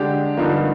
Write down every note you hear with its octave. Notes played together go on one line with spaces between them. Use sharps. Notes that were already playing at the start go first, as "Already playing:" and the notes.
Already playing: D3 G#3 D4 G4
G2 D3 F3 A#3 D#4